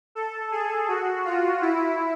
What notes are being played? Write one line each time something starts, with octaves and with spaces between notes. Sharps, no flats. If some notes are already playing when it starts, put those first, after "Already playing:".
A4
G#4
F#4
F4
E4